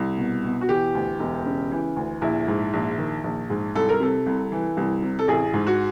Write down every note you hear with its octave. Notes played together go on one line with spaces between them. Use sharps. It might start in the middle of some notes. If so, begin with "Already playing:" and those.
Already playing: C2
B2
B2
F#4
E3 G4
D2
E1
C#3
E3
D2
A#1 E4
G#2
A#1
D#3
A#1
G#2
C2 A4
A#4
C3 A4
C2
E3
C2
C3
A4
A1 G#4
G#2
F#4